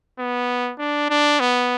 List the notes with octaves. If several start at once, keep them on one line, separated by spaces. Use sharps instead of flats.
B3
D4
D4
B3